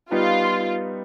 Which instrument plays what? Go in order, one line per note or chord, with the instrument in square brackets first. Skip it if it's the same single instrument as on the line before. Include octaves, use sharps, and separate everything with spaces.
[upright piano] G3 B3 D#4 [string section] F4